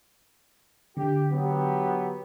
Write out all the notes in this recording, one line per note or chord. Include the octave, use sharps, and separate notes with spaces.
D3 G4
F#3 B3 G4